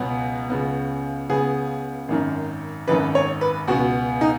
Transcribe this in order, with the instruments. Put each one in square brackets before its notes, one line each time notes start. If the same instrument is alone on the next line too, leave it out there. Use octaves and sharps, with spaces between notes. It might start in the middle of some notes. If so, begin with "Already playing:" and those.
Already playing: [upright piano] C#2 B2 F#3 B3
C#2 C#3 B3
C#2 C#3 B3 G#4
G#1 F#2 D#3
G#1 F#2 D#3 B4
C#5
B4
C#2 B2 B3 F#4
D#4